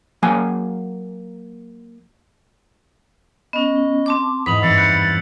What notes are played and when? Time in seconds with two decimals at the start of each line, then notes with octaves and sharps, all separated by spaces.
0.23 F#3 A#3 G#5
3.53 B3 C#4 D#5
4.06 C4 A5 D6
4.46 E2 G#2 B5 D#6 B6 F7 F#7
4.62 G2 E3 C4 E6 A6 C7 C#7
4.78 F#6 G6 C#7